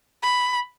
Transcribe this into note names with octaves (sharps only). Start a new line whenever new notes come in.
B5